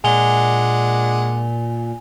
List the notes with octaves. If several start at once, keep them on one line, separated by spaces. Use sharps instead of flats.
A#2 G#3 D4 F#5 G#5 F7 G7